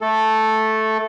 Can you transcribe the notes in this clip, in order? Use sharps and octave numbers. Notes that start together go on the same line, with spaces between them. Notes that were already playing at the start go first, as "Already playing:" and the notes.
A3 A4